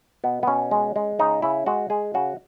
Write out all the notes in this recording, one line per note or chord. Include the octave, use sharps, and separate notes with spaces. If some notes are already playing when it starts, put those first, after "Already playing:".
B2 B3
B3
B2 C#4
G#3
G#3
C#3 D#4
C#3 E4
G#3 F#4
G#3 G#4
C#3 F#4